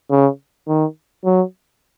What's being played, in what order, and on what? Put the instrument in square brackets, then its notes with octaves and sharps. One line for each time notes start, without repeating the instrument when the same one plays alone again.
[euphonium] C#3
D#3
F#3